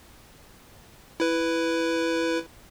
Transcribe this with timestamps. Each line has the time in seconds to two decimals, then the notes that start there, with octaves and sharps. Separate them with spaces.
1.20 E4 B4